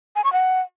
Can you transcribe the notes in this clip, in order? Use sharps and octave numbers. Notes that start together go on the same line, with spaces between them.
G#5
C#6
F#5